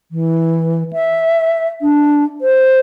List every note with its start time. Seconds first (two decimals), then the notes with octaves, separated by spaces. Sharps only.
0.12 E3
0.93 E5
1.82 D4
2.41 C5